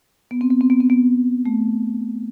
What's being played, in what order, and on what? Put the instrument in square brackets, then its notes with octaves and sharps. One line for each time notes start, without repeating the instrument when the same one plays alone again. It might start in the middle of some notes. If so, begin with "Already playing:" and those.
[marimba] B3
C4
B3
C4
B3
C4
B3
A3